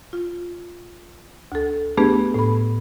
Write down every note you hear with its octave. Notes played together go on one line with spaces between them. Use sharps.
F4
D2 A4
A3 B3 D4 G4 G#4 B4
A2 B5